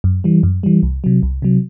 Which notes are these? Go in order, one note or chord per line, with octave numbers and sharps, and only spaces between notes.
F#2
E3 G3
F#2
E3 G3
C2
C3 F#3
C2
C3 F#3